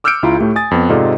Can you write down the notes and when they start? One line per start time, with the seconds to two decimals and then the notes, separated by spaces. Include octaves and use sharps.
0.04 D6 E6 F6 G6 C#7 D7
0.23 C#2 E4 F4 A#5
0.39 A2 A3 G4
0.56 G#5 D#6 A6
0.71 F2 B3
0.90 G#2 C3 F4 A4 D5 D#5